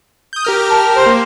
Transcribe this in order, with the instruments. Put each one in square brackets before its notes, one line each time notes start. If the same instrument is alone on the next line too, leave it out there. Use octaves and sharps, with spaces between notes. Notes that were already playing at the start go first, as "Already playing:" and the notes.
[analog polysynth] D#6 G6
G4 A#4 F6
[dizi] A5
C5
[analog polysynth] A#3